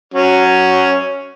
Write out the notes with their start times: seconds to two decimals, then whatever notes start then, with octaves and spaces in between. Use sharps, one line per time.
0.14 F#3 C#4